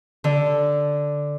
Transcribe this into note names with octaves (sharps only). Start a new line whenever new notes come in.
D3